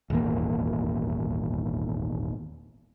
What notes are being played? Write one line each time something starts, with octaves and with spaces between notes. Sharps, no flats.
D#1 G#1 E2 A#3